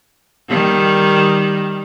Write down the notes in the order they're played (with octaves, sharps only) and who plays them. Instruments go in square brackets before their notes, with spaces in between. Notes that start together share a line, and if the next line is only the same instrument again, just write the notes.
[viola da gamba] D#3 G3